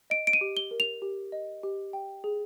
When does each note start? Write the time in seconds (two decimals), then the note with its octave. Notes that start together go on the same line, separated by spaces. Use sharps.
0.10 D#5 D7
0.27 D7
0.33 D#7
0.41 G4
0.57 G7
0.71 A#4
0.80 F7
1.02 G4
1.32 D#5
1.63 G4
1.93 G5
2.24 G#4